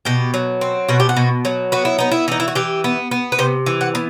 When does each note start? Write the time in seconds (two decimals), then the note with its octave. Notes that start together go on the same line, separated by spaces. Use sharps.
0.05 B2 G4
0.34 F#3
0.61 C4
0.88 B2 F#4
1.00 G4
1.09 F#4
1.16 B2
1.45 F#3
1.72 B3 F#4
1.85 E4
1.98 B3 D#4
2.11 E4
2.28 E3 D#4
2.40 E4
2.48 F#4
2.55 E3 G4
2.84 B3
3.11 B3
3.32 B4
3.39 C3 C5
3.66 E3
3.81 F#5
3.95 B3